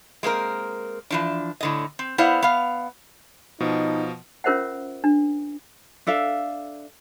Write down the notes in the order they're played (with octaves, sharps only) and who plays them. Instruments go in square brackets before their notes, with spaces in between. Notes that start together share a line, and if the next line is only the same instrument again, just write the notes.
[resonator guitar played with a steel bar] G#3 A#3 C4 A#4
E3 F3 D4
A2 D3 D#5
C4
B3 E4 C5 D5 F5 F#5
B3 F5
[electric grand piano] B2 F3 [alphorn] D#4
[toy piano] C#4 F4 A#4 C5 E5 F#5
D4
[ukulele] D4 A4 E5 F5